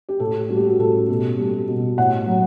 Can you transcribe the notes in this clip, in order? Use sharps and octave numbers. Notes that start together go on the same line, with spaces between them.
G4
A2 A4
G3 F#4
G4
F#4
A2 A4
B2 A4
G3
B2
A2 F#5
F#3